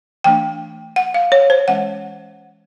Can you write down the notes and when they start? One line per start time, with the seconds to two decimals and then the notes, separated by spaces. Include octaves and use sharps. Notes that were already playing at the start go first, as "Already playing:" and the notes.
0.24 E3 A3 D4 G5
0.96 F#5
1.14 F5
1.32 C#5
1.50 C5
1.68 E3 G#3 C#4 F#5